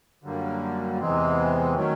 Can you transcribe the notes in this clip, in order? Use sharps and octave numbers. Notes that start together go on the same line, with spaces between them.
F#2 D3 G3 A#3
E2 C3 E3 G#3 C4
D#3 F#3 A3 C#4